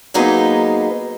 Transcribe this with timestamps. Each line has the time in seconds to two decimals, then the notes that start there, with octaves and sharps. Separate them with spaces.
0.14 F#3 A#3 B3 D#4 G#4 C5